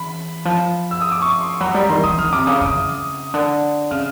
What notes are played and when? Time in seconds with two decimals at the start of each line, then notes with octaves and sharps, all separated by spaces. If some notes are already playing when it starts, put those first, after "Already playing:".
Already playing: E3 B5
0.45 F3
0.91 E6
1.02 D#6
1.12 D6
1.22 C#6
1.41 C6
1.60 F#3 B5
1.74 G3 A#5
1.89 D#3 C6
2.04 D#3 D#6
2.18 D#3 F6
2.32 C3 D6
2.47 C#3 D#6
2.61 C#3 D#6
2.76 C#3
3.34 D3
3.91 C#3 F6